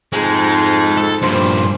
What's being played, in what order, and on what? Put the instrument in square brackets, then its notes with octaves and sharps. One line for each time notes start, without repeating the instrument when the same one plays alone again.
[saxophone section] F2 G#2 [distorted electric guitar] G#3
[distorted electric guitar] A4
[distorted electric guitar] G2 A#2 [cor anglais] C5